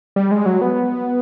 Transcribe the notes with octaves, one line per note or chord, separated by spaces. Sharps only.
G3
G#3
F#3
B3